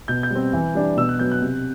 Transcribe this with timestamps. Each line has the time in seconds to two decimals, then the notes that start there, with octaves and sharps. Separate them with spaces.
0.08 B2 G6
0.23 G6
0.31 G3 C4
0.53 E3
0.75 G3 D4
0.97 B2 E6
1.09 F#6
1.19 F#3 B3 G6
1.32 F#6
1.42 C3